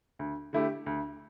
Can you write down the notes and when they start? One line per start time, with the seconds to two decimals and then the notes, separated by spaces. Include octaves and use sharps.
0.19 D2
0.53 D3 A3 E4 G4
0.86 D2